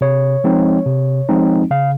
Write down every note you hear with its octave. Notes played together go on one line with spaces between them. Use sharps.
C3 C#5
F3 G#3 C4 D#4
C3
F3 G#3 C4 D#4
C#3 F5